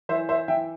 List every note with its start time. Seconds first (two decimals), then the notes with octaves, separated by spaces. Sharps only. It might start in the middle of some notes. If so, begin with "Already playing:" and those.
0.09 E3 C5 E5
0.29 C5 E5
0.48 E3 E5 G5